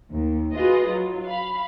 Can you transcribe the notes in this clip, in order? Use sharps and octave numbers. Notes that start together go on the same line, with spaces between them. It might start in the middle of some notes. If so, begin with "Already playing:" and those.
D#2
F4 F#4 G#4 B4 D#5
F#3 F4
F5 B5